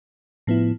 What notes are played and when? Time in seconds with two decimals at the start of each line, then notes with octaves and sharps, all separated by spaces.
0.47 A2 F3 B3 E4